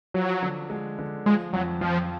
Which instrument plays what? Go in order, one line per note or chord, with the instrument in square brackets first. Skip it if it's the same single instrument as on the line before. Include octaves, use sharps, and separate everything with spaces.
[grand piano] F3 [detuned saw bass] F#3
[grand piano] D3
G#3
D3
[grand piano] F3 [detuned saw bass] G#3
[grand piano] F2 [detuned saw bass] F#3
[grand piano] F2 [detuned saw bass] F3